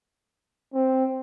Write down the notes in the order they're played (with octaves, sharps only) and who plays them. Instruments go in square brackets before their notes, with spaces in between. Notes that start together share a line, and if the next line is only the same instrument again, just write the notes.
[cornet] C4